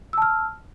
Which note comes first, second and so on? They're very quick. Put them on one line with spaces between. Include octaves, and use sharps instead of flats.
E6 A5 F6